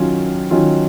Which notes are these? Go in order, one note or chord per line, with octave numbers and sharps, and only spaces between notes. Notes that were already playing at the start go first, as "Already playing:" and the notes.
Already playing: D#3 F#3 C#4 F4
D#3 F#3 C#4 F4